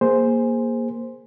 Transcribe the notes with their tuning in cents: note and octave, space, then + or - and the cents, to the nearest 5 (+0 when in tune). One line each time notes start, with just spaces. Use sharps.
A#3 +5 G#4 -10 C5 +0